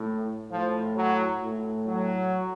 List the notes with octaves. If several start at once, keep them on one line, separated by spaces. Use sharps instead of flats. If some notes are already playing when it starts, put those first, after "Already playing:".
Already playing: A2
A2 F3
F#3
A2
F#3